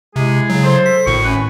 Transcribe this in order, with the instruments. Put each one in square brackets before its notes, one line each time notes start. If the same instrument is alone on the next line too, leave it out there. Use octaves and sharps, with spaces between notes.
[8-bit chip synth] C3 [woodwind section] G#3 E4 G#4
[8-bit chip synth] C#3 F#3
[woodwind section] A4 C5
[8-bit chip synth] B6
[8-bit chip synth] G#1 A2 [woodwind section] C#6
[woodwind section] A3 C#4 B4